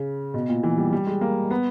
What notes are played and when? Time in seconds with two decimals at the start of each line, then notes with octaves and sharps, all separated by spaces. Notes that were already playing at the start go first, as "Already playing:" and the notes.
Already playing: C#3
0.34 B2
0.49 A#2
0.63 E3
0.77 G3
0.93 G3
1.07 G#3
1.21 A#3
1.51 B3